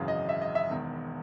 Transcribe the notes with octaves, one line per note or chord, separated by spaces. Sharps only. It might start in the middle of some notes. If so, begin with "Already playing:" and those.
Already playing: G#1 F#2 C#3 E3
D#5
E5
D#5
E5
E1 E2 D#3